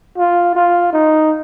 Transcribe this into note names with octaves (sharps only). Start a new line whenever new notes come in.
F4
F4
D#4